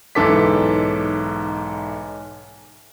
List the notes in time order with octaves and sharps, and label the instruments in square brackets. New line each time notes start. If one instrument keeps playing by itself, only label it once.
[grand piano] B1 G#2 E3 A4 D6 B6